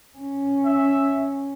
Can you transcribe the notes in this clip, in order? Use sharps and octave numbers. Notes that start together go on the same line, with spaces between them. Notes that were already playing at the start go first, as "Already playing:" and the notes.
C#4
E5